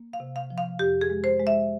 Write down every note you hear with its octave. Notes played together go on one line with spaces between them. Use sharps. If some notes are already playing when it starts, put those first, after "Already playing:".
Already playing: A#3
F5
C3
F5
F3
F5
F2 G4
G#4
G#3
C5
G#3
E5